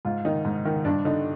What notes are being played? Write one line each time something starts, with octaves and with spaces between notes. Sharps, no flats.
G#2 F4
D#3 D#4
G#2
D#3
G2 D4
D3 D#4